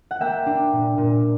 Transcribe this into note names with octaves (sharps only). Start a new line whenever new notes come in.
F#5
A#3 E5 G5
D4
A#2
A#2